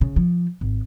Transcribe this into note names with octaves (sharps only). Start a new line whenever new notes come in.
C#3
F3
G#1